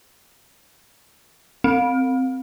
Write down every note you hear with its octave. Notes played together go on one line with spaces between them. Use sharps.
C4